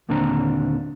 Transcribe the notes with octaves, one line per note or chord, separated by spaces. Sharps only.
D#2 A#2 D3 C4 D4 A#5